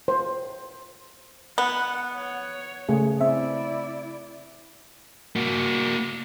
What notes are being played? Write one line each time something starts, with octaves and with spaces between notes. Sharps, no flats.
C5
B3 F#5
C#5
C#3 A3 G#4
C4 E4 D5 E5
A#3 F#4